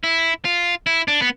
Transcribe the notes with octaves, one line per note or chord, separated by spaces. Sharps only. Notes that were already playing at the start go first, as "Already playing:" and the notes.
E4
F4
E4
D4
B3